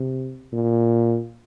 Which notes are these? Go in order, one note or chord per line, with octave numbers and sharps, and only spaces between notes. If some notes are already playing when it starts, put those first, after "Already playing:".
Already playing: C3
A#2